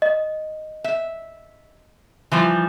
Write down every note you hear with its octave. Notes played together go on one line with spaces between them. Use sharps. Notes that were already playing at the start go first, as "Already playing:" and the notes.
D#5
E5
E3 F3 G3